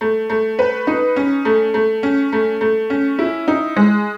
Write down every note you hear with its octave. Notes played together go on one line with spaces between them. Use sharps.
A3
A3
B4
D#4
C#4
A3
A3
C#4
A3
A3
C#4
E4
D#4
G#3